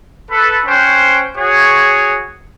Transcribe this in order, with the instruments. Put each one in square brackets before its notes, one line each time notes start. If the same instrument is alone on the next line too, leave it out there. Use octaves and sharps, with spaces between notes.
[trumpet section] A4 B4
C#4 C5 F#5 G5
F#4 G#4 C#5